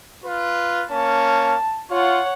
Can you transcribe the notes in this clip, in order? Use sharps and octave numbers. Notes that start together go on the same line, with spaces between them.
F4 B4
A#3 C#4 A5
F4 C#5 F#5